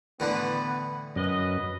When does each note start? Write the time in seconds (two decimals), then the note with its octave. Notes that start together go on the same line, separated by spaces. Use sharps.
0.20 A2 D3 E3 B3 D4 B4
1.16 F#2 B4 D#5